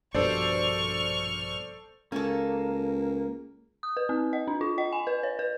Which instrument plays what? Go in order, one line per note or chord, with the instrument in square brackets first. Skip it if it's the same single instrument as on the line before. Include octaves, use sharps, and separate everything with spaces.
[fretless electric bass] A#1 G2 B2 [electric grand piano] A4 C5 D5 [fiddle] C#6 F6
[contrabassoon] C#2 [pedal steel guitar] A#3 [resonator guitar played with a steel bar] C#4 A4
[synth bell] D#6
B4
C4
D#5
D4
F4
D#5
G#5
B4
C#5
B4